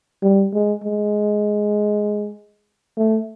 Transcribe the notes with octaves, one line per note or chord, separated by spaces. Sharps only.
G3
G#3
G#3
A3